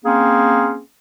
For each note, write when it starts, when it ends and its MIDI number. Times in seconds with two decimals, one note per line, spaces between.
0.04 0.80 58
0.04 0.80 60
0.04 0.80 61
0.04 0.80 68